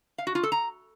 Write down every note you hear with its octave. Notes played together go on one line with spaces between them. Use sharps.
F5
F#4
F4
A4
A#5